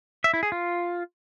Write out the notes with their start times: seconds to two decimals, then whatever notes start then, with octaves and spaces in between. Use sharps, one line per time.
0.24 E5
0.33 E4
0.43 G#4
0.52 F4